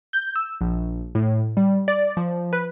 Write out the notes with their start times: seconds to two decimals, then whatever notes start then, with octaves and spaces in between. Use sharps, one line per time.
0.13 G6
0.36 E6
0.61 A#1
1.15 A2
1.57 G3
1.88 D5
2.17 F3
2.53 B4